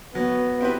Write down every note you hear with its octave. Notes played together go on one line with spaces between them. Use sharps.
F#3 B3
C4 E4 G4 B4